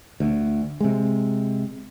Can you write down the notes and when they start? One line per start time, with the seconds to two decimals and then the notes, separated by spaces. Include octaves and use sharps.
0.20 D2
0.80 C3 G#3